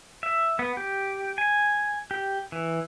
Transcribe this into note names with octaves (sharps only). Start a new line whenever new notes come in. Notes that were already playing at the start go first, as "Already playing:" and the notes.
E5
B3
G4
G#5
G4
E3